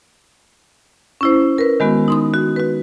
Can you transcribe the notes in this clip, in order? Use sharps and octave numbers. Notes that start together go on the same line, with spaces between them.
C#4 E4 C5
A#4 B4
D#3 G#3 B3 F#4
D#4 C6 D#6
F#4
F#4 B4